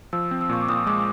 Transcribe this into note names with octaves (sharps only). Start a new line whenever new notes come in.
F3 E6
C4
E6
A#2 C#6
D6
A#2 D#6
G#3 D6